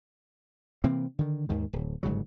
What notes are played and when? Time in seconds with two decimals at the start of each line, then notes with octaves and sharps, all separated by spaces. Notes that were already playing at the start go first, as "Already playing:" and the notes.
0.84 C3 E3 A#3 C4
1.19 D3 D#3
1.49 D#2 G#2 D#3
1.73 D1
2.03 G1 G#2 C#3 F#3